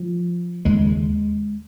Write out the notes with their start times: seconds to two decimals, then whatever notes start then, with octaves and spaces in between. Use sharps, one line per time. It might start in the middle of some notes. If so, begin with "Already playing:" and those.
Already playing: F3
0.65 D#2 C#3 G#3